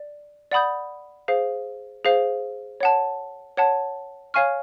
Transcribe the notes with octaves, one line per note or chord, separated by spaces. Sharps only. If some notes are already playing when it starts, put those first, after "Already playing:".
Already playing: D5
D5 F#5 B5 D#6 G6
G#4 C5 F5
G#4 C5 F5
C#5 F#5 A5
C#5 F#5 A5
C#5 F5 G#5 C#6 F6